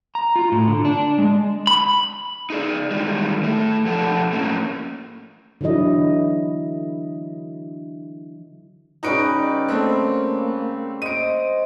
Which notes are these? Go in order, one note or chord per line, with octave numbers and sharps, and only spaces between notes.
A#5
F4
A2
D3
D4
G#3
B5
D#4 G#4 D5
D#3 E3 G3 G#3
A2 A3
F2 F3 G4 A4 F#5 A5
A2 A#3 C#4
D3 E3 F#3 E4 D#5
C#3 G3 D#4 F#4 B4 D7
A3 A#3 C4
C5 D#5 D7 D#7